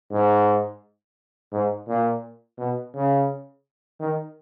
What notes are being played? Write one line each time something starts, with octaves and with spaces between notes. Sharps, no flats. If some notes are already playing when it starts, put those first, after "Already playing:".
G#2
G#2
A#2
B2
C#3
D#3